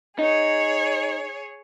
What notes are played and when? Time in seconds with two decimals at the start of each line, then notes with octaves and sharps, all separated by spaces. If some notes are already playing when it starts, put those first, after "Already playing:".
0.19 D#4 G#4 C#5